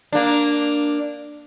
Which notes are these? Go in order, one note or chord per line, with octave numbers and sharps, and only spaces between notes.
A#3 D4